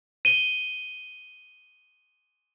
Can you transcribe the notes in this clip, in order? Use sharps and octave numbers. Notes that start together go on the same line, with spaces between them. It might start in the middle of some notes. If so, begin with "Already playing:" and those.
D#7 G7